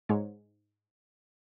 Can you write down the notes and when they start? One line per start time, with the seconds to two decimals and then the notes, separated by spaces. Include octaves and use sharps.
0.09 G#2 G#3 C#5